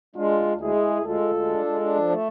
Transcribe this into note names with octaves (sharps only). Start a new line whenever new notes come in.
G#3 D4 F4
D2
D2
G#3 E4 G#4
D2
D2
G#3 F4 A4
D2
G#3
D4
G#3
D4
F3
A3